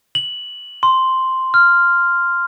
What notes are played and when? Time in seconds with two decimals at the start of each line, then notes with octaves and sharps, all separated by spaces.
0.15 F#7
0.83 C6
1.54 F6